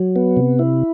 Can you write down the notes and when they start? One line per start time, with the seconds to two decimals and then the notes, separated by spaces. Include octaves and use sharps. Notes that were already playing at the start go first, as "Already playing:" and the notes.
Already playing: F#3
0.16 B3
0.37 C3
0.59 E4